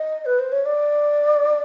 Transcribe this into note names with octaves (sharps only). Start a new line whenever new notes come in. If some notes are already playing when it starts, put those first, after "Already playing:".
Already playing: D#5
B4
C5
C#5
D5